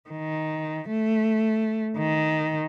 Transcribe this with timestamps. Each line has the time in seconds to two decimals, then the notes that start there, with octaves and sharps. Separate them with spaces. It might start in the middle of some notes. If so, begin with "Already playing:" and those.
0.10 D#3
0.88 A3
1.97 D#3